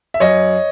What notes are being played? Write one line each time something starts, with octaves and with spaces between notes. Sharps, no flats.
E5
F#2 C#5 D#5